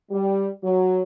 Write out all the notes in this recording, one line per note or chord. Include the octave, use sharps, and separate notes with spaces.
G3
F#3